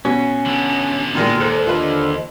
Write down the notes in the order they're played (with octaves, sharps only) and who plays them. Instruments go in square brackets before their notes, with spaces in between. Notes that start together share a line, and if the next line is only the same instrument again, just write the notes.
[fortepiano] B2 [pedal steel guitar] C#4
[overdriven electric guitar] D3 B3
[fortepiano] A#2 D#3 G#3 [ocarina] F#4
[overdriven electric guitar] D#2 [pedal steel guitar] A4 F#6 [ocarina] C5
[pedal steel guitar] D3 C5 [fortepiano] F4 B4 [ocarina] D#5